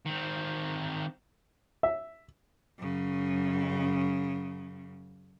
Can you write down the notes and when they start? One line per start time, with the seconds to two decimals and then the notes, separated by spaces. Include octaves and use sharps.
0.06 D#3 C4
1.83 E5
2.78 F#2 C#3